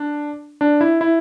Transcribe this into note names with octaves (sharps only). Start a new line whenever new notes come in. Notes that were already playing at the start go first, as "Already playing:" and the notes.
Already playing: D4
D4
E4
E4